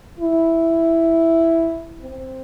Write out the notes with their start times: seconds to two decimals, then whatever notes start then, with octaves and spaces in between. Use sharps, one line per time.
0.19 E4
2.01 C4